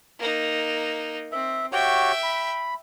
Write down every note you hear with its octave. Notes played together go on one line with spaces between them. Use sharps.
A#3 D#4
C4 E5
F#4 G4 C#5 E5 G5
B5